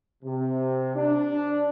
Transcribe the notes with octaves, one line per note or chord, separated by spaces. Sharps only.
C3
D4